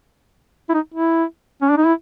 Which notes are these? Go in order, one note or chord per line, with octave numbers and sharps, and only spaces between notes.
E4
D#4
E4
C#4
D4
D#4
E4